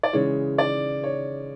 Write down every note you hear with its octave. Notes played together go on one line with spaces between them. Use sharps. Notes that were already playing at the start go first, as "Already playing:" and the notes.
D5
C#3 E3 G#3 C#5
D5
C#5